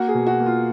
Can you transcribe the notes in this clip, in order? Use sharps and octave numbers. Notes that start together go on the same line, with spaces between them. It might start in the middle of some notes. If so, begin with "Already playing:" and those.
Already playing: A#3 F#4
G#4
B2
F#4
A#3
F4